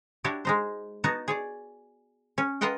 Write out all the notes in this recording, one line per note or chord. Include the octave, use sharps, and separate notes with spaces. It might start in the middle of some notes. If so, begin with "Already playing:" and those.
D4 E4 F#4 G4 C#5
G#3 D#4 C5
B3 D#4 F#4 A5 A#5
G#4 C#5 D5
C#4
F4 A#4 B4 D#5 F#5 G5